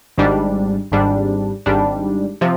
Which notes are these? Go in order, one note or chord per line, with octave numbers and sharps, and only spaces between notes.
G#1 G#2 G3 D4
G#1 G#2 G3 D4
G#1 G#2 G3 D4
C3 F3